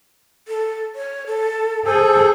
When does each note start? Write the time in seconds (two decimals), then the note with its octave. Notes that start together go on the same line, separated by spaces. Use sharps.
0.48 A4
0.95 C#5
1.27 A4
1.86 G#4 A4 C5